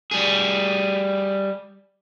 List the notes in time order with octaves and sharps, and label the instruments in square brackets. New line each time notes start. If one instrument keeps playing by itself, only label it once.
[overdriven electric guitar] G3 G#4